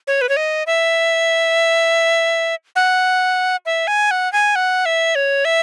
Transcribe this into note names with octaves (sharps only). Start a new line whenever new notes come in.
C#5
B4
C#5
D#5
E5
F#5
E5
G#5
F#5
G#5
F#5
E5
C#5
E5